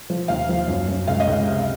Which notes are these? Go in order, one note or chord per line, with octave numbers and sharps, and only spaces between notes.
F3
D#2 F5
F3
F#2
F#2
C#2 F5
D#5
C#2 F5
C3